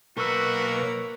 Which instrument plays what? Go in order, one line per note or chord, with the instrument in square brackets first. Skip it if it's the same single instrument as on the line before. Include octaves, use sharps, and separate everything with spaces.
[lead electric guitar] B1 B4 [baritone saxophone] A#3 [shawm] F#4 [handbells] C#6 E6 B6